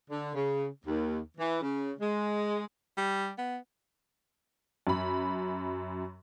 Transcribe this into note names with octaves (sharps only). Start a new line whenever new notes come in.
D3
C#3
D#2
E3
C#3
G#3
G3
B3
F#2 B5